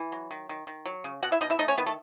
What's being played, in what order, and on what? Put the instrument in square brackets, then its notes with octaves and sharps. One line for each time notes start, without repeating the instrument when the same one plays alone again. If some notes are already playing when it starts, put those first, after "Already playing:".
Already playing: [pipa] E3
F#3
D#3
D#3
D#3
F#3
C#3
B2 F#4 F#5
E4 E5
B2 D#4 D#5
E4 E5
A3 D#4 D#5
C#4 C#5
D#3 B3 B4
A3 A4